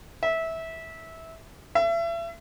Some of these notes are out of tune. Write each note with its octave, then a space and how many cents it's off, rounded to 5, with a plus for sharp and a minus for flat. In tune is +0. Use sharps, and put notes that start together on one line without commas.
E5 -15
E5 +35